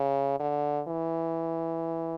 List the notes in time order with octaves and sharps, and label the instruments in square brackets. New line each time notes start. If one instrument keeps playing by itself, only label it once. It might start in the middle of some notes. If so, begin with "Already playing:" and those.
Already playing: [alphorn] C#3
D3
E3